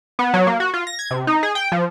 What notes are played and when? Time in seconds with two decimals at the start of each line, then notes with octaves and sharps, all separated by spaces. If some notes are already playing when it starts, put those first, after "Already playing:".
0.19 B3
0.34 F#3
0.47 A#3
0.60 F#4
0.74 F4
0.87 A#6
0.99 G#6
1.11 C3
1.27 D#4
1.43 G#4
1.55 G5
1.72 F3